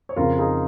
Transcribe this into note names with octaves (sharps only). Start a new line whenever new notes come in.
C#5
F2 C#3 F4 A#4
D#4 G#4